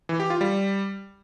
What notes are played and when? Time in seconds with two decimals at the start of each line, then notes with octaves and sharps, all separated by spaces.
0.09 E3
0.20 G4
0.30 F4
0.41 G3